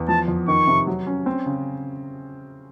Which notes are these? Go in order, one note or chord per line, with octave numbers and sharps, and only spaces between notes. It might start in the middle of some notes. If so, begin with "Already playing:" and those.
Already playing: E2
F3 A5
F2
D#3 C#6
C3
F#3
C#4
C4
C#3